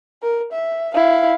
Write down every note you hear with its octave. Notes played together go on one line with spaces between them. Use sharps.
A#4
E5
E4 F5